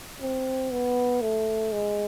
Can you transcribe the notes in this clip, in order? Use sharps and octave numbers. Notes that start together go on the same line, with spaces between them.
C4
B3
A3
G#3